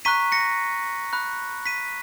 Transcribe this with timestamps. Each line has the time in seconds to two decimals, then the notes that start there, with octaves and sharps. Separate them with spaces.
0.05 A#5 C#6 F#6 B6 D#7
0.32 A#6 C#7
1.13 B5 F#6
1.66 B6 D#7